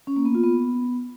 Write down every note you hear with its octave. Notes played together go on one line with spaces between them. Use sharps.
C#4
A#3
B3
F4
B3